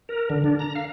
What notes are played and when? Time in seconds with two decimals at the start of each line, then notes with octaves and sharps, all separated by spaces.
0.09 A#4
0.30 D3
0.44 D4
0.59 A#5
0.75 F5